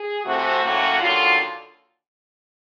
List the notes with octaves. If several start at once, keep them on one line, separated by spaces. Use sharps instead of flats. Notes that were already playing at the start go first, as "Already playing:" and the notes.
Already playing: G#4
C3 E3 A3 C4 F#4
A2 F#3 A#3 C#4
D#2 D3 F#3 F4